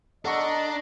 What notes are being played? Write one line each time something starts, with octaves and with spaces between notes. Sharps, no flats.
D4 A4 D#5 F#5 A#5 C#6